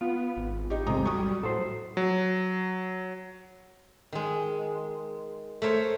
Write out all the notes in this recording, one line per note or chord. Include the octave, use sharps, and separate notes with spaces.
B3 F4
G#1
A1 D#4 G4
D#1 G#2 C3 A#5 D#6
F#3 G3 C#6 D#6
A2 F#3 A4 C5
F#3
D#3 G#3
A3 A#4 C5 C#5